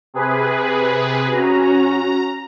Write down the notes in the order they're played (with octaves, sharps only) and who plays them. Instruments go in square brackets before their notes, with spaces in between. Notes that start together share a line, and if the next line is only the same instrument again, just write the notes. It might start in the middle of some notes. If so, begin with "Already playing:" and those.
[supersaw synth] C3 G#4 B4
[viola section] C#4 F#4 [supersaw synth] A#5